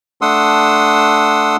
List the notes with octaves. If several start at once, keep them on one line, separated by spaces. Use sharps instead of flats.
A3 D4 F#5 C6 D#6 E6